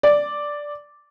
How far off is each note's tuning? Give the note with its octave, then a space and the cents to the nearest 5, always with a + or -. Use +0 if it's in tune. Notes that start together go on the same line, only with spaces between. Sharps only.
D5 +0